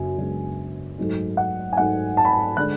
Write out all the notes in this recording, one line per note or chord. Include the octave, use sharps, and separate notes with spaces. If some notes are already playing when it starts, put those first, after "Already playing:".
Already playing: F#2 C#3 B3 D4 G#5
F#2 C#3 G#3 B3 D4
G#2 F#3 A3
F#5
G#5
G#2 F#3 A3 F#5
A5
B5
A5
D3 G#3 D4 F#6